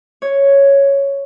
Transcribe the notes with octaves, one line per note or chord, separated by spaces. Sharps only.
C#5